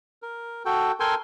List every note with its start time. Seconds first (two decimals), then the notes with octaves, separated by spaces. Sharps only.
0.22 A#4
0.65 F#4 A4 G5
1.00 A4 A#4 G5 G#5 C6